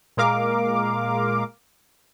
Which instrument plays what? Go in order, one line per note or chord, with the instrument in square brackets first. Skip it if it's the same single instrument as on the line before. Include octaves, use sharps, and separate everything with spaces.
[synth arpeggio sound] A#2 G#3 A#4 F5 D6